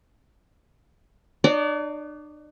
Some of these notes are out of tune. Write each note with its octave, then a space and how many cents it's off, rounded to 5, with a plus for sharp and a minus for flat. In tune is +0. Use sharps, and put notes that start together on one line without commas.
D4 +45 D5 -35